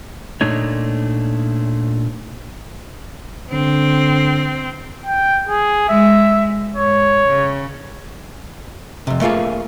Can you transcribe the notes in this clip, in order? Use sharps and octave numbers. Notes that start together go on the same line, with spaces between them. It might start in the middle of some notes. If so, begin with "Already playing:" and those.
A#2 A3 D4 D#4 C#5
D3 C4
G5
G#4
G#3 E5
G#2 C#5
C#3
F2 C3
A3 A#3 F4 G#4 F5